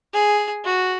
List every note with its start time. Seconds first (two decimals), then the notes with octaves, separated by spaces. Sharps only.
0.14 G#4
0.65 F#4